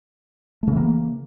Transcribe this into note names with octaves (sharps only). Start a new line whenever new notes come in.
C#3 E3 A3 A#3